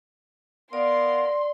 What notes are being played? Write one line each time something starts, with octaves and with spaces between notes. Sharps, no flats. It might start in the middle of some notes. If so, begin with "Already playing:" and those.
B3 A#4 D5 F5 C6